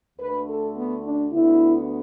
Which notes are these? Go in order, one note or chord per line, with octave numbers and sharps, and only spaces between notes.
D2 D3 A3 B4
A4
B3
D4
D2 D3 B3 E4